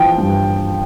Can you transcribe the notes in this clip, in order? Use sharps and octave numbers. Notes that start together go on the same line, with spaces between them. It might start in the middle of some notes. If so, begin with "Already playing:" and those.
Already playing: E3 F3 G5
G2